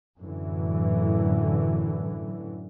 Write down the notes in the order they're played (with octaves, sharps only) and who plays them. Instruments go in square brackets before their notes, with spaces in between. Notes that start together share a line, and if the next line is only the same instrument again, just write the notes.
[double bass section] F#2 A2 D3 E3